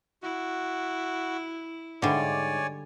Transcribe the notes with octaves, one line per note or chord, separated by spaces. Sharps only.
E4 F#4
G#2 D3 G3 C#5 D5 E5 G#5 B5